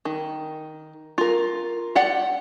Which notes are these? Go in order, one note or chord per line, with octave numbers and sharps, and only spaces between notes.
D#3
F4 A#4
G4 D5 F#5